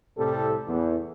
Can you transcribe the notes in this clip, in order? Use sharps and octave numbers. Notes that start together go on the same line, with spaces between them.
C2 A2 C3 G3 A4
E2